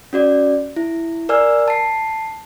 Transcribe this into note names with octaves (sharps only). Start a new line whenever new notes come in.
C#4 F#4 D5
E4
A#4 D5 G#5 E6 F6
A5 C7